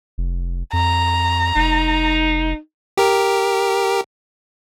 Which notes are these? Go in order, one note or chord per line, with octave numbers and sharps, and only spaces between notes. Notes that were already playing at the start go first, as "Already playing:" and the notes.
F1
F2 A#5
F1 D#4
G4 A#4